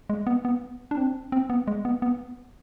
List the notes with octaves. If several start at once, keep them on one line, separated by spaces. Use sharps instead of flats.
G#3
B3
B3
D4
C4
C4
B3
G#3
B3
B3